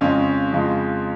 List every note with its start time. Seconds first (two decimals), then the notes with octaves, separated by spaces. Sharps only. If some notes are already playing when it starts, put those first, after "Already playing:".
0.01 F2 C#3 G#3 C#4 F4
0.53 F2 C#3 F3 G#3